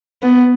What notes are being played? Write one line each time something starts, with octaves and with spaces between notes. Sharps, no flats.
B3